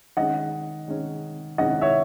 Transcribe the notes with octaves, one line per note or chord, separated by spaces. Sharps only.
D#3 G#3 C#4 D#5 F#5
D#3 G#3 C#4
D#3 G#3 C#4 D#5 F#5
C#5 E5